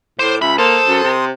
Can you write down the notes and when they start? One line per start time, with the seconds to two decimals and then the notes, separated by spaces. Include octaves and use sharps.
0.19 A2 C5 D6 G6
0.42 C#2 E5 B5
0.58 A#3 A4 C5 C6 D#6
0.87 F#2
1.03 C3